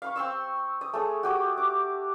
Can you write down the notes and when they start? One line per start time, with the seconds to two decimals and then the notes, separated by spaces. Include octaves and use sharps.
0.02 F5 B5 C#6
0.16 C4 C6 C#6 E6
0.81 D#6
0.93 A3 G#4 C#5
1.23 F#4 G4 D#6
1.57 D6